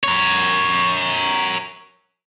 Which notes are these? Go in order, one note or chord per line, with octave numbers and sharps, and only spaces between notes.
A#4 C#5